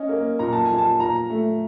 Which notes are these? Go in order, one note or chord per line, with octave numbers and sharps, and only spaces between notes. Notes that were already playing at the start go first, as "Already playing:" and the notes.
Already playing: C#4 D#5
A#3
A#2 A#5
A5
F3 G#5
A5
A#2 A#5
A3